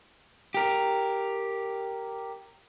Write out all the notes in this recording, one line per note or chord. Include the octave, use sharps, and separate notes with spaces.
G4 A#4